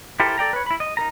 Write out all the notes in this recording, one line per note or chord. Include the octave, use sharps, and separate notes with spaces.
E4 G4 A4 A#4 C5
A4 D5 G5 A#5
B4 C#5
E4 B5
D#5
D#4 A#4 A#5